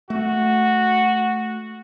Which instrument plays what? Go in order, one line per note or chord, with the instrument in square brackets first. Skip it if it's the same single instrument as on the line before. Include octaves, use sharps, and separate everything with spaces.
[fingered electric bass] A3 [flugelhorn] F#4